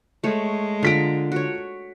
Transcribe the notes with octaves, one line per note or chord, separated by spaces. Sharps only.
G#3 A3 C#5
D3 F4 A#5 B6 D7
F#4 C#5